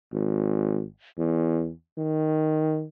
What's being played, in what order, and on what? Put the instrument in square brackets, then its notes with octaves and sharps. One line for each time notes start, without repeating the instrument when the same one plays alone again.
[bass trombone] G#1
E2
D#3